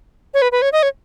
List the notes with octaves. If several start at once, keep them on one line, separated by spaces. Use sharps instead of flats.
C#5
B4
B4
C#5
D#5
C#5